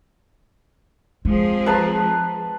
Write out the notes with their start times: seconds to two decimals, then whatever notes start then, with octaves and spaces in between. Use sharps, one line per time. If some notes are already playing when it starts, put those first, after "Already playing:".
1.25 F3 G#3 C4 G#4
1.66 B4 A5 A#5